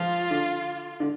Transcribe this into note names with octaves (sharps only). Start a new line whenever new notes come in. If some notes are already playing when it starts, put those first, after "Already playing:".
Already playing: F3 F4
D3
D3